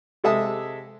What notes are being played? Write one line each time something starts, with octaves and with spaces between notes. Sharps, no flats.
C3 G#3 A4 E5 A5 D#6